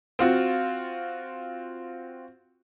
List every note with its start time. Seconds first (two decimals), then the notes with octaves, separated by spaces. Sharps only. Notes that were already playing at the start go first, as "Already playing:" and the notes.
0.19 C4 F4 F#4